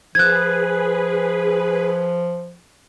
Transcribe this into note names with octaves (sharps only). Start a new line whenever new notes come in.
F3 G#4 B4 F#6 G#6